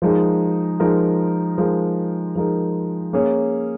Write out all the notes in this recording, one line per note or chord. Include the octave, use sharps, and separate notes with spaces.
F3 G#3 D#4 A#4
F3 G#3 D#4 A#4
F3 G#3 D#4 A#4
F3 G#3 D#4 A#4
A#3 C#4 G#4 C#5